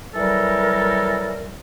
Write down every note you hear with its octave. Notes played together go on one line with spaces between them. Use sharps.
E3 F#3 G3 A4 A#4